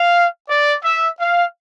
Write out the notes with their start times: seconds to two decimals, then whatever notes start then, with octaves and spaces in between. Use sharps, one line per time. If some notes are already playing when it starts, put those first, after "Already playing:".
Already playing: F5
0.48 D5
0.83 E5
1.19 F5